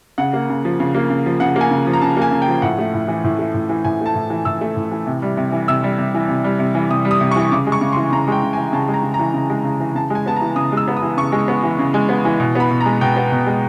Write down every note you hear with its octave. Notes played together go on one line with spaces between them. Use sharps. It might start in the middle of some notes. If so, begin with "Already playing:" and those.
C#3 F#5
A#3
C#3
F3
C#3
A#3
C#3
F3
C#3 F#5
A#3
G#5
C#3
F3
A#5
C#3 A5
A#3
G#5
C#3
G5
F3
A2 F#5
A3
A2
E3
A2
A3
A2
E3
A2 G#5
A3 A5
A2
E3
A2 E6
A3
A2
E3
C3
G3
C3
E3
C3 E6
G3
C3
E3
C3
G3
C3
E3
C3 D#6
G3
D#6
C3
C#6
E3
C#3 D6
G#3
C#6
C#3
C6
E3
C#3 A#5
G#3 G5
C#3
G#5
E3
C#3 A5
G#3
A#5
C#3
A#5
E3
C#3
G#3
C#3
E3
C#3 A5
G#3 G#5
B3 A5
A#5
E3
C#3 D#6
G#3 E6
B3
D#6
E3
C#3 C#6
G#3
B3
E3
C#3
G#3
B3
E3
B2
B3 B5
B2
A#5
G#3
B2 G5
B3
B2
G#3